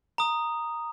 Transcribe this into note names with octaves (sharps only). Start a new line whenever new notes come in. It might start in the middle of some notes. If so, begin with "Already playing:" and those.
A#5 D#6